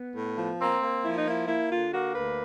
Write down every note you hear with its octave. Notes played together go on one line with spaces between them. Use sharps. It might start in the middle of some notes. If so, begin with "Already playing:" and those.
Already playing: B3
A2
F3
A#3 C4
A#3
F3 E4
D#4
A#3 E4
A#3 E4
D3 F4
A#3 F#4
D2 B4